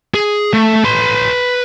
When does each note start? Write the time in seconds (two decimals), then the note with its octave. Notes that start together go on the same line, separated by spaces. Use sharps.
0.14 G#4
0.53 A3
0.84 B4 C6